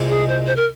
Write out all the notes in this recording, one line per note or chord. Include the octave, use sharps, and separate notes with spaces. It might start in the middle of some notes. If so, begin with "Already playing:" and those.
Already playing: C2 A#2 G#3 C4
G#4
C5
C5
A#4